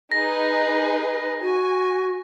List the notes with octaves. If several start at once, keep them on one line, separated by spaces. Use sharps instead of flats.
D#4 G#4 B4 A#6
F#4 G#5